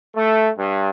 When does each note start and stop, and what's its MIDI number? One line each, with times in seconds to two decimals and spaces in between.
0.16 0.50 57
0.58 0.90 43